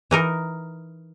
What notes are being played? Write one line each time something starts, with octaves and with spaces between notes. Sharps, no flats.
E3 D#4 A#4